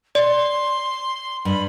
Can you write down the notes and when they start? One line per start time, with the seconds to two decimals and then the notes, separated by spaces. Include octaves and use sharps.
0.15 D5 C6
1.45 G2 B5